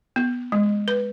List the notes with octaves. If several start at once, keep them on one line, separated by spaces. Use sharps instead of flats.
B3
G#3
B4